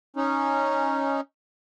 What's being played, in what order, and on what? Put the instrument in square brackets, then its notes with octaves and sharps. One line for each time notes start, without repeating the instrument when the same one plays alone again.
[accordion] C#4 D#4